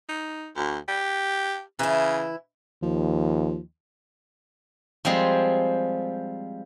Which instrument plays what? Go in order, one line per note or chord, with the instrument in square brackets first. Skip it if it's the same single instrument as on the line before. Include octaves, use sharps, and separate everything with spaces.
[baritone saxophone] D#4
D2
G4
[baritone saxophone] C#3 [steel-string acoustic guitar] E3 E4
[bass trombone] D#2 [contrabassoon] F3
[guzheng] F3 G3 G#3 C4 G#4